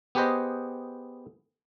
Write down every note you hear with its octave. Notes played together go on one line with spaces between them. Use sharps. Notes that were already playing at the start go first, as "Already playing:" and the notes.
B3 G4 G#4 B4 C5 D#5